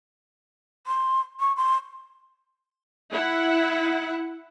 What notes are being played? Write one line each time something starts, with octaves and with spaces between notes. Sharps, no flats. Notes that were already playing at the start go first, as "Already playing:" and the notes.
C6
C#6
C6
E4 F#5